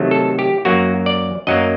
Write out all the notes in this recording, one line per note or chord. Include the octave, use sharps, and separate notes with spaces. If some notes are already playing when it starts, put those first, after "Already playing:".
Already playing: C3 D#3 F#3 A3
A4
G4
F#2 F#3 A#3 F#4
D5
F#2 F#3 A#3 D#5